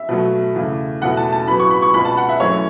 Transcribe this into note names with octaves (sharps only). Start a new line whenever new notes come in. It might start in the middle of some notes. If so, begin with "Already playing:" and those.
Already playing: E5
B2 F#3 A3
E2 C#3 A3
E2 B2 A3 F#5
A5
A5
A2 F#3 B3 B5
C#6
B5
C#6
C#2 B2 B3 B5
A5
F#5
E5
F#2 E3 A3 C#5